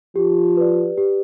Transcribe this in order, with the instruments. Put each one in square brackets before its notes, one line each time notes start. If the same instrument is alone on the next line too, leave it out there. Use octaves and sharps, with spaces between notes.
[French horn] F3 [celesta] G4
[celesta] B4 D5
G4